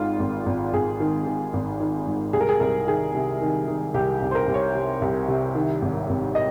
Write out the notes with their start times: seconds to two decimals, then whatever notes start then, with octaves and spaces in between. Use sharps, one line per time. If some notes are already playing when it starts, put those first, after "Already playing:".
Already playing: G#1 G#2 D#3 F4
0.19 G#1
0.46 G#1
0.73 G#1 G#4
1.00 D#3
1.26 D#3
1.53 G#1
1.80 D#3
2.07 G#2
2.33 C2 G#4
2.41 A#4
2.49 G#4
2.60 C2 A#4
2.87 D#3 G#4
3.15 C3
3.42 D#3
3.68 D#3
3.94 C2 G4
4.22 C2
4.31 C5
4.35 A#4
4.47 C2
4.54 C#5
4.75 C3
5.02 C2
5.28 C3
5.55 D#3
5.82 G#1
6.09 G#1
6.35 D#5